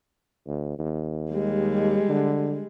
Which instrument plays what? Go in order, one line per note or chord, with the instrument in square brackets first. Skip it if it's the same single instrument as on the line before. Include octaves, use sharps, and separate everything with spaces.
[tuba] D2
D#2
[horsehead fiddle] G3 G#3
[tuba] D3